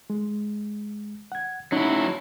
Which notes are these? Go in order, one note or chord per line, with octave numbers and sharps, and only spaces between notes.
G#3
F#5 G#6
F#3 C#4 D#4 E4